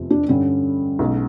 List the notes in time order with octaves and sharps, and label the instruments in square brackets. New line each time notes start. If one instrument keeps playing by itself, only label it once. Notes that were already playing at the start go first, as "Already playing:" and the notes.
Already playing: [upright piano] F1 E2 C3 F3
[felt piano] D4
[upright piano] G2 D3 G3 [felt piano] C#4
[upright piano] B1 B2 G#3